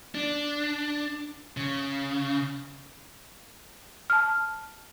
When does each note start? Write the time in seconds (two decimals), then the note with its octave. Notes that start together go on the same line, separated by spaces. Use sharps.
0.15 D4
1.57 C#3
4.10 A5 F6